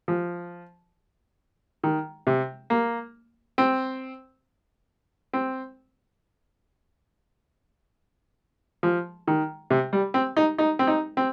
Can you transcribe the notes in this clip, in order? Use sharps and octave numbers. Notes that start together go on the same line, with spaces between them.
F3
D#3
C3
A#3
C4
C4
F3
D#3
C3
G3
C4
D#4
D#4
C4
D#4
C4